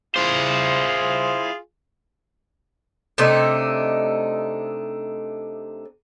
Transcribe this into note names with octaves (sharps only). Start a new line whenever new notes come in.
E4 F4 G#4 C5
C3 A3 D4 D#4